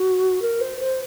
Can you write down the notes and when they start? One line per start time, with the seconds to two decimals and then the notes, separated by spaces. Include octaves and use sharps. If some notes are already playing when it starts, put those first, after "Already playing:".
Already playing: F#4
0.41 A#4
0.61 C5
0.80 C5